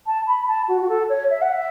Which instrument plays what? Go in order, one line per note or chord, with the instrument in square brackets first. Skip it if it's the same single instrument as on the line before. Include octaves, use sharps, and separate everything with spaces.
[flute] A5
B5
A5
F#4
F#4
A4
C#5
E5
F#5
E5